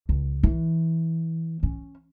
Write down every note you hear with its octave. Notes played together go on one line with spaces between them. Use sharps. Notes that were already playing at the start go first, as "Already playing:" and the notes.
C#2
E3
C#4